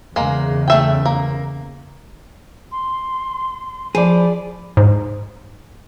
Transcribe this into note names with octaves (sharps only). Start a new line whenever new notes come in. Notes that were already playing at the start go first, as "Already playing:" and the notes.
E2 C#3 G#3 A#3
A3 E5 G5
A#3
C6
F3 G#4 D5 B5
G#2